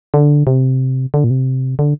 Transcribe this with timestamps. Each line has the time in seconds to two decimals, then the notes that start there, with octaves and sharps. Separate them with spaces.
0.14 D3
0.47 C3
1.14 D3
1.24 A#2
1.30 C3
1.79 D3